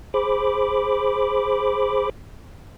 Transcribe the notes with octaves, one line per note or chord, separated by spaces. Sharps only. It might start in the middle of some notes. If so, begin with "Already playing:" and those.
G#4 C5 B5 D6